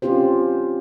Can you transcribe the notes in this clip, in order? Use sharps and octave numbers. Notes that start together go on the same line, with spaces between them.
C4 C#4 F4 G4 C5